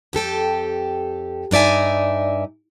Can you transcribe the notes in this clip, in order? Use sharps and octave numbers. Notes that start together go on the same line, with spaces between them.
F2 G4 A4 G5
G2 D#4 D5 E5 G#5